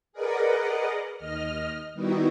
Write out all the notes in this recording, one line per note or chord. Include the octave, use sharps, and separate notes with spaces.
G#4 A#4 B4 D5 D#5 F#5
D#2 D#5 F6
D#3 G3 B3 D#4 E4 F#4